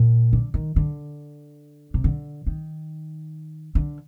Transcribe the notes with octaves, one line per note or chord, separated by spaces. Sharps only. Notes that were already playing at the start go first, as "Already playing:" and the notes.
Already playing: A#2
D3
D#3
D3
C3
D3
D#3
D3